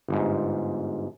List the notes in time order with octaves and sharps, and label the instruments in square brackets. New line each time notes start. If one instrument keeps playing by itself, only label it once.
[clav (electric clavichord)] G1 G#2